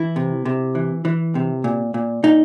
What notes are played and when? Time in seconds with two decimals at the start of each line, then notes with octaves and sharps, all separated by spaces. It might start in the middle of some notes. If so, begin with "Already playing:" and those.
Already playing: E3 E4
0.16 C3
0.45 C3
0.75 E3
1.05 E3
1.35 C3
1.64 A#2
1.94 A#2
2.23 A#2 D#4